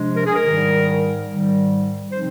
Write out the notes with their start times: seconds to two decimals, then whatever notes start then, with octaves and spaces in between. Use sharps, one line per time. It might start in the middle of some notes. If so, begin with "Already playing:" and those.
Already playing: C3 F3 G#3 D4
0.16 A#4
0.26 G#4
0.36 A#4
0.44 G#2 D#3 G3
1.28 G#2 D#3 G3
2.12 C3 F3 C4 D#4 C5